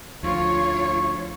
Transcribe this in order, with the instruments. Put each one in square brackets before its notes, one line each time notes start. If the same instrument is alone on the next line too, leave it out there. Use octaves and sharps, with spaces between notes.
[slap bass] D2 F3 [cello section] F4 C#5 [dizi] C#6